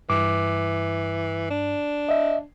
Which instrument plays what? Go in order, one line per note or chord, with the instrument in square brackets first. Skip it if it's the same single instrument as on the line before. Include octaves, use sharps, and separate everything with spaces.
[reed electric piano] G2 D6 [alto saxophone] E3
[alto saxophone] D4
[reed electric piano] D#5 E5